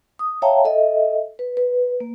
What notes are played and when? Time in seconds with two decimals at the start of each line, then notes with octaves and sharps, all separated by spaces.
0.19 D#6
0.42 C#5 E5 F5 G5 A5 A#5
0.65 A4 D#5 E5
1.39 B4
1.57 B4
2.00 A#3